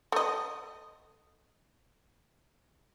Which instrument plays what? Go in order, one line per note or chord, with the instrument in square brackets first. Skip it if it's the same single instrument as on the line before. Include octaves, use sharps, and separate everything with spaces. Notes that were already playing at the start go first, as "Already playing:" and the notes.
[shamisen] A3 D#5